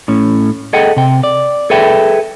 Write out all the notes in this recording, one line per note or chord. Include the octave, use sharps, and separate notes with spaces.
A2 C#4
G#4 A4 D#5 F#5 G5
C3 G5
D5
G#4 A4 B4 E5 G5